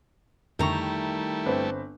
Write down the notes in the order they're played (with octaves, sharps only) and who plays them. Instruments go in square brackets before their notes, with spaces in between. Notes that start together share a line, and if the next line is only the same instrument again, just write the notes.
[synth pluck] F2 D3 C#6 [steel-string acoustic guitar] D#3 A#5 [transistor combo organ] G3 A3 E4
[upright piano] G1 C4 B4